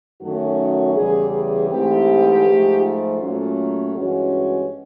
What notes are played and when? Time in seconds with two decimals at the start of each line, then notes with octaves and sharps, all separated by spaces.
0.21 F#2 D#3 F#3 A3 C#4 F#4
0.95 E2 C#3 E3 G3 G#4
1.33 G#4
1.70 G#2 E3 A3 C4 G4
2.45 G#2 F3 A3
2.82 F4
3.19 A#2 F#3 A3 C#4
3.94 G2 E3 G#3 C#4 F#4